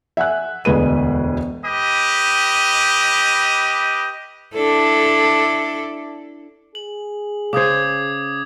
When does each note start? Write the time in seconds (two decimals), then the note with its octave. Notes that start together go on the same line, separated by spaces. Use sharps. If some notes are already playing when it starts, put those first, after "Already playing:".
0.17 E5 F#5 G#5 F#6
0.65 E1 D2 G#3 B4 D#7
1.65 G4 B4 D#5
4.55 D4 E4 A4
6.75 G#4 F#7
7.53 C#3 C5 D6 D#6 G#6